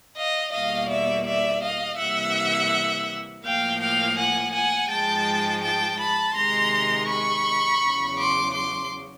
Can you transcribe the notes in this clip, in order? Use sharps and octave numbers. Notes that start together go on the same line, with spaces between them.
D#5 F5
E2 B2 G3 A#3 D#5 F5
D5 E5
D5 E5
D#5 F5
C3 E3 G3 A#3 E5 F#5
A2 F3 A#3 F5 G5
F5 G5
F#5 G#5
F#5 G#5
G#2 F3 G#3 G5 A5
G5 A5
A5 B5
C3 D#3 G#3 A#5 C6
B5 C#6
E2 C#3 F#3
C6 D6
C6 D6